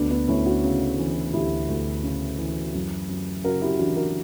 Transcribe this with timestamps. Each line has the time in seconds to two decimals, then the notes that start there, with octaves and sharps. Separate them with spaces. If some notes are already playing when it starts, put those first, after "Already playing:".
Already playing: D2 B3 D4
0.11 B3 D4
0.28 D2 C#4 E4
0.46 D4 F#4
0.63 C#3
0.99 E3
1.34 D2 E4 G4
1.69 D2
2.03 C#3
2.39 E3
2.74 F#2
3.09 F#2
3.44 C#3 F#4 A#4
3.61 E4 G4
3.79 E3 D4 F#4
3.96 F#4 A#4